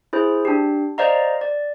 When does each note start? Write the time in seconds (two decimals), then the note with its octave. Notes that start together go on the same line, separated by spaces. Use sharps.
0.13 E4 G#4 C5
0.45 D4 G4
0.98 C5 D5 D#5 F5 A#5
1.41 D5